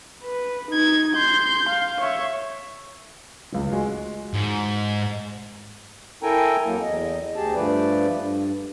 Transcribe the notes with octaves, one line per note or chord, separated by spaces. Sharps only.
B4
D#4 G#6
C6 G6
F5
C#5 E5
D1 C#2
G#3 F4 F#4
G#2
E4 A4 A#4 G5 G#5 A#5
F2 F#3 A#3
E2 D#5
D2 G4 G#4 A5
G2 F3 A3 B4 D5
G2